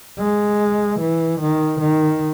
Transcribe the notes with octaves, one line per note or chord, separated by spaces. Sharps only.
G#3
E3
D#3
D#3